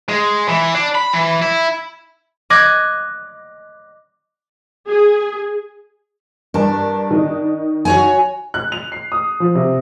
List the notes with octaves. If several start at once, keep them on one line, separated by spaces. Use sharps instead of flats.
G#3
E3
D4
B5
E3
E4
D#5 D6 F#6 G#6 A#6
G#4
G2 D4 A#4 A5
D#3 D#4
F#4 C#5 G#5
F#6
F7
C7
D#6
F3
C3